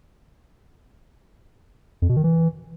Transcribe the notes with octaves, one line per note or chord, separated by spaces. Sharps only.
F2
B2
D#3
E3